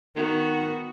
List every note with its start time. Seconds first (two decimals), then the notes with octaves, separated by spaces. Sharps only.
0.16 D#3 B3 F#4